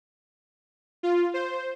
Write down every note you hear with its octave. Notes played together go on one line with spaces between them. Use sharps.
F4
C5